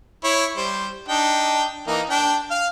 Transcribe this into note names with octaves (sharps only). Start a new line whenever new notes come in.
E4 C#5
G3 C5
D4 D#4 G5
E3 A#3 D#4
D4 G5
F5 F6